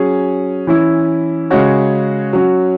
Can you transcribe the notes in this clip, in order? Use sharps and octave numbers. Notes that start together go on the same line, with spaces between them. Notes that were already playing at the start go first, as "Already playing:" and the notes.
Already playing: F#3 C#4 G#4
E3 C#4 E4
C#3 G#3 C#4 F#4 C#5
F#3 C#4 F#4